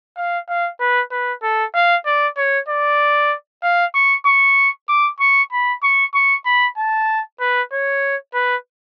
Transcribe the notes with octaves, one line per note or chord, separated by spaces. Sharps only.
F5
F5
B4
B4
A4
F5
D5
C#5
D5
F5
C#6
C#6
D6
C#6
B5
C#6
C#6
B5
A5
B4
C#5
B4